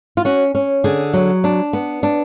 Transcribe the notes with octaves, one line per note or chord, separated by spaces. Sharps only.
F4
C#4 F#4
C#4
D3 G#4
F#3
D4
B3
D4